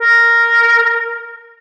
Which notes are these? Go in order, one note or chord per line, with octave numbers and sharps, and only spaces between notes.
A#4